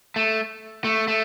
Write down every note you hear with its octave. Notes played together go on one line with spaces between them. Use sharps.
A3
A3
A3